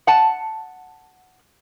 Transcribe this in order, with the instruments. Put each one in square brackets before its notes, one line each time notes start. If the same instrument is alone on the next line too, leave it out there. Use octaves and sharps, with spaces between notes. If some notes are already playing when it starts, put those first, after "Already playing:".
[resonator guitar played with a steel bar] F#5 A5